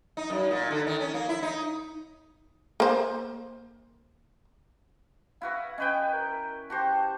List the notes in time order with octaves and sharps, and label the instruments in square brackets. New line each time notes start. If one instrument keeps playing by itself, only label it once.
[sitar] D#4
F#2
A#2
D3
D#3
C#4
A#3
E4
D#4
[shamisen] A#3 C5
[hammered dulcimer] E4 F#4 B4 [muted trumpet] F5
[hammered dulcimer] C#4 B4 G5 [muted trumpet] D#5
[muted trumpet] A#4
[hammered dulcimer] F#4 G4 C5 [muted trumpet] A5